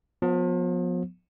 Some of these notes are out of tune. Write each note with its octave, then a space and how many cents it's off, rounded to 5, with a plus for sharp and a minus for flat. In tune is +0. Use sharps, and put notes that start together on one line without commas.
F3 +40 B3 +0